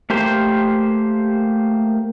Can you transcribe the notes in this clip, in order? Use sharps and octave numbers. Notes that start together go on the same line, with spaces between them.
A3 A#3 G4 C5 G5